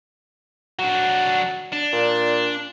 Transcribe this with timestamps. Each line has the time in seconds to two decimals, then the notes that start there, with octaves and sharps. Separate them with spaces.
0.79 F#3 D4 F#4
1.72 D4
1.92 A#2